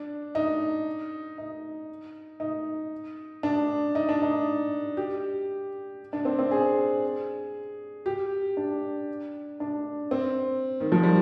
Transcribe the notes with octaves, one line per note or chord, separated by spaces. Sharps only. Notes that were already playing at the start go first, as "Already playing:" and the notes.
Already playing: D4
D#4
D#4
D#4
D4
D#4
D4
D#4
G4
D4
C4
C4
G#4
G4
D4
D4
C4
D#3
F3
G3